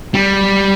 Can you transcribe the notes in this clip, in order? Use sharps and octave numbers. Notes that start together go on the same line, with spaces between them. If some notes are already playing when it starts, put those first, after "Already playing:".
G3